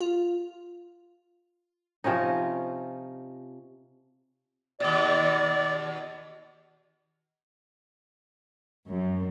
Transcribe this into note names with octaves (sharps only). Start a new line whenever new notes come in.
F4
C3 F3 C#4 D#4
D#2 B2 D5
F#2